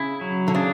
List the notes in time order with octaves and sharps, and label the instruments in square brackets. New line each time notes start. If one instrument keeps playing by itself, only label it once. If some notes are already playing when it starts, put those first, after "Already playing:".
Already playing: [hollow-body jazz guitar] C#3 [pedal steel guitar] E4
[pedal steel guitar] F#3
[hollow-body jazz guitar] D3
[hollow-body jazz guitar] C#3 [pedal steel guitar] D4